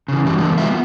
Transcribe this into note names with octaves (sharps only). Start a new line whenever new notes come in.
C#3 E3
G2 E3 G3
D3 E3 G#3 B3 A#4
G3 F4 G4 B4 D#5 E5
B3